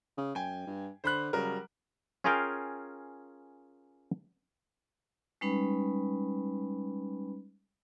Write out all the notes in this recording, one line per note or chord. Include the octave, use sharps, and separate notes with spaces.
C#3
F#2 G5 G#5
G2
D3 C5 B5 F#6
C#3 F#3 G3 A#4
C#4 F4 G#4 A#4 F5 G5
G3 G#3 C#4 D#4 B4 B5